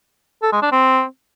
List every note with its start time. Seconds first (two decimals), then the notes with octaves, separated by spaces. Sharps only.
0.42 A4
0.52 G#3
0.62 D4
0.72 C4